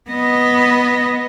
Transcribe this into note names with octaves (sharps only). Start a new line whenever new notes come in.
B3 D#5